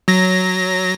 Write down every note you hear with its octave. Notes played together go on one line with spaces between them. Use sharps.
F#3 A#6